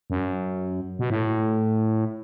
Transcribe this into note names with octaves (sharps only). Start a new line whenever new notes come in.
F#2
B2
A2